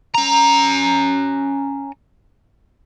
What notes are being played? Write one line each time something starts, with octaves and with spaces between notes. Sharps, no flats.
C#4 A#5